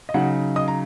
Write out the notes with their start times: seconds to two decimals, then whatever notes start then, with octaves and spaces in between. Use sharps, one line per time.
0.09 D#5
0.14 C#3 F#3 D#4 F#4 F#5
0.56 D#5 D#6
0.68 A#5